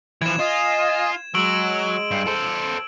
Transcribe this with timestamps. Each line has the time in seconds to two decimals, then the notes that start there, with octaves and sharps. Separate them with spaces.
0.22 E3 F3 G#6 E7
0.40 F4 D#5 G#5
1.35 F#3 G#3 E6 D7 F#7
2.11 G2
2.27 A4 C5